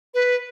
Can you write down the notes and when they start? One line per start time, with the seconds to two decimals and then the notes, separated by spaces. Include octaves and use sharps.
0.14 B4